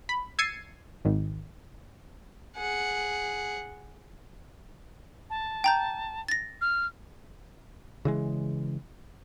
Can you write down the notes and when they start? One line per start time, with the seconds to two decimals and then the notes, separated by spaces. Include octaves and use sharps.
0.09 B5
0.39 E6 G#6 A6 C7 C#7 D#7
1.05 G#1 D#3
2.56 G#4 F#5
5.30 A5
5.64 G5 A#5 G6
6.28 A6 A#6
6.61 F6
8.05 C#3 E3 G#3